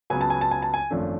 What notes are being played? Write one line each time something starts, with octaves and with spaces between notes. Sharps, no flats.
C#2 C#3 F#3 B3 G#5
A5
G#5
A5
G#5
A5
G#5
G#1 F#2 F3 A3 D4